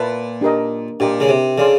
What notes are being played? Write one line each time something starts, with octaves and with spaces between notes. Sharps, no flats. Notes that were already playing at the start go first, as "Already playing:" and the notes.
Already playing: A#2 B4 E5 A5
D4 G4 A#4 D#5
A#2 D4 G4 A#4 D#5
C#3
C3
C#3 A4 D5 F5 G#5 C6